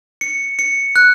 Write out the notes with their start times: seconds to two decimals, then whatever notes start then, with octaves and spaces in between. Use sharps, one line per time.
0.21 C#7
0.59 C#7
0.96 F#6